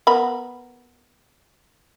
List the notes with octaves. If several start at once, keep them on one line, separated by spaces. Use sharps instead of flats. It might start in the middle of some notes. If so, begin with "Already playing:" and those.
B3 A#4 B5